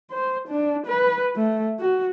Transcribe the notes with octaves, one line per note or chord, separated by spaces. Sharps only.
C5
D4
B4
A3
F#4